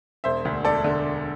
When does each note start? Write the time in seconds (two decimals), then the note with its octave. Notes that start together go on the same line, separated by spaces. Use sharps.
0.24 E1 C5 E5
0.45 D2 D3
0.64 E1 A4 D5
0.84 D3